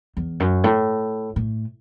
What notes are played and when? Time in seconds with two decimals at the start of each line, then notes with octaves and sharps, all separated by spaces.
0.17 E2
0.40 F#2
0.64 A2
1.36 A2